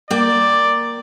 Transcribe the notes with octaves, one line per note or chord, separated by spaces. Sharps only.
A#3 D5 G5